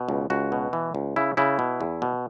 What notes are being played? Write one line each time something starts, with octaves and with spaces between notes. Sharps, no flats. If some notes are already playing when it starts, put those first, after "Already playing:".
Already playing: B2
C#2
C#2 F#4
B2
E3
C#2
C#3 E4
C#3 E4
B2
E2
B2